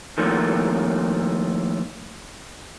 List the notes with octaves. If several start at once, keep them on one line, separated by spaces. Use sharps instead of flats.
D#3 F3 A3 A#3